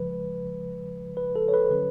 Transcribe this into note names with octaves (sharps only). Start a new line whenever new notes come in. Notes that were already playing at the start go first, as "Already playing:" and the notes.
Already playing: C#3 F3 G#3 B4
B4
A4
C#5
B4
D3 F#3 C#4 B4